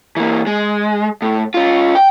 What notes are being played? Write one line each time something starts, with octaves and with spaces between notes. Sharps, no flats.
E3 A#3
G#3
A2
C#4 F4
G5